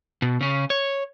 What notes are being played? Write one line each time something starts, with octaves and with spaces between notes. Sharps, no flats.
B2
C#3 C#4
C#5